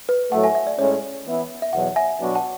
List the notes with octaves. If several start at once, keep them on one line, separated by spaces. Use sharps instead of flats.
B4
A2 F#3 A3 F#5
E5 G#5
E5
D5
A2 G#3 C#4 C#5
E3 B3 E4
E5
E2 B2 F#3 F#5
E5 G#5
B2 F#3 B3 D4 F#4
F#5 A5